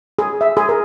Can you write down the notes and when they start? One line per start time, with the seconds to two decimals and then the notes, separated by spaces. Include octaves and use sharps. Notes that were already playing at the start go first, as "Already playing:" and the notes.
0.19 G#4
0.41 E5
0.57 G#4
0.69 A#4